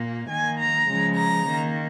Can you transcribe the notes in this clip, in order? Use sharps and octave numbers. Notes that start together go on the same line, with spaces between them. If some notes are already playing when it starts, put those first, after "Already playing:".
Already playing: A#2 A#3
D#3 A#3 G#5
A#5
C#3 F3 G#3
A#5
D#3 A#3